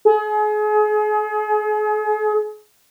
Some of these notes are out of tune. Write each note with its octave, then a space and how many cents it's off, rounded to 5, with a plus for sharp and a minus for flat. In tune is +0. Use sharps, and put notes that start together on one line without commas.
G#4 +35